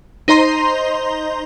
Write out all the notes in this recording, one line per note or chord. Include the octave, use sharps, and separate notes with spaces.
D#4 C5 D#5 A#5 C6